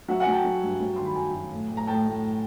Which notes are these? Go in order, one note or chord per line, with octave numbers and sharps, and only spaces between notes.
F#3 E5 F#5
F#5 G#5
F#3
G5 A5
F#3
G2
F#3
D#3 C6
B5
F#2 G#5 A#5
F#3
A2
A2
A#5
A2 G5 A5
A2